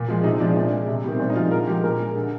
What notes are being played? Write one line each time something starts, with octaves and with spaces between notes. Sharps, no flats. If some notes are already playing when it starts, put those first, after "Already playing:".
Already playing: A#2
F3 G#3
C3 D#4
F3 G#3 D4
A#2 D4
G#3
C3
D#3 G3
C4
A#2 D4
D#4
F3 G#3 F4
D3 A#4
F3 G#3 G4
A#2 A#4
G#3
D3